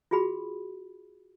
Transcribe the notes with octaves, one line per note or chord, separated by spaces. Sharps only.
F4 F#4 G#4 B5